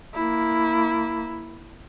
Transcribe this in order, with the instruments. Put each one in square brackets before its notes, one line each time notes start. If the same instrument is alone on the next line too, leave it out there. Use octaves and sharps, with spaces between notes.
[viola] A#3 E4